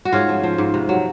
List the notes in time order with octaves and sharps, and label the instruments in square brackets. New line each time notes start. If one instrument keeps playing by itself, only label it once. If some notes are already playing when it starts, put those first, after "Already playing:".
[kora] F#4
G#2 C#4 F4
F3
F3
G#2
C3
F#3